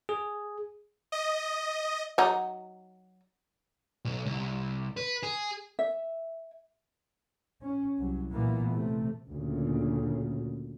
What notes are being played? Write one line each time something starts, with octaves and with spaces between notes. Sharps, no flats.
G#4
D#5
F#3 D#4
B1
C2
B4
G#4
E5
C#4
C2 F#3
A#2 E3 A#3 B3
C3 A3
D2 A#2 C#3